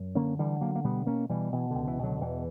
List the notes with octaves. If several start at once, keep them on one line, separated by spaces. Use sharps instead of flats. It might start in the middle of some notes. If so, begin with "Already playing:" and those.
Already playing: F#2
D3 A#3 C#4
D3 E3 G3
D3 F#3 A#3
A#3
B2 G3 B3
B2 A#3 C#4
B2 E3 G3
B2 E3
C#2 D3
E3
B2 D3 F#3
E2 E3